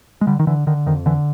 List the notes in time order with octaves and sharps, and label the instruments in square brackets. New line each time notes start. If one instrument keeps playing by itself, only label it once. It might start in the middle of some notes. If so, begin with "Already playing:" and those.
[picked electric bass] G#3
D3 G3
D#3
D3 E3
D3 D#3
F2 D#3
D3 E3